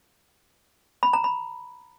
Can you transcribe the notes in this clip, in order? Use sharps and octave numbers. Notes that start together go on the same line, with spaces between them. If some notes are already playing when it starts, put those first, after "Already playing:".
B5
A#5
B5